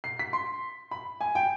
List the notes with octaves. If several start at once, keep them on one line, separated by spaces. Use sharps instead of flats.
C7
B6
C6
B5
G#5
G5